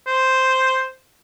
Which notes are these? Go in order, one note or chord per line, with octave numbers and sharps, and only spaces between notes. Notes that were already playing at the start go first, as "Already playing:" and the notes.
C5